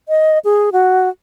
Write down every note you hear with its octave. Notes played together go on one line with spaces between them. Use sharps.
D#5
G#4
F#4